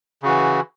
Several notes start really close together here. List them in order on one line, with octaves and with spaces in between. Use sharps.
C#3 F#4 E3